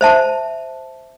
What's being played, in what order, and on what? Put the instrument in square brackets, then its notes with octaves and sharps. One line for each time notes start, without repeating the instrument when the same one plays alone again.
[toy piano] C5 E5 A5